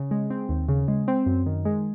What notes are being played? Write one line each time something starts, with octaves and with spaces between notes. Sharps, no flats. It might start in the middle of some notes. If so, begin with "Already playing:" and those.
Already playing: C#3
G#3
C4
D#2
C#3
G#3
C4
F#2
D#3
G#3